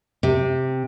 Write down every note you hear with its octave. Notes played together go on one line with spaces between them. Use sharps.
C3